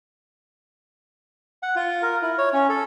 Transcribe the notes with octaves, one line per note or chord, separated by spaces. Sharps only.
F#5
F4
A#4
E4
C#5
C#4
A4